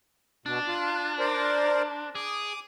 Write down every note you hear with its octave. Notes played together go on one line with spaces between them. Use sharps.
B2 D4
F4
A#4 C5 D5
G#4 D6 D#6